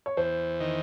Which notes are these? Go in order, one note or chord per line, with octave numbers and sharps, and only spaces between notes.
C#5
E2 C5
D#3